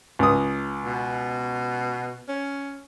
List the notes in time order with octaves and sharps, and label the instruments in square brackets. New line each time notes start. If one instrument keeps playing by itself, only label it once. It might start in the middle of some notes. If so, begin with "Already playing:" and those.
[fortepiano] C#2 D#6
[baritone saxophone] B2
C#4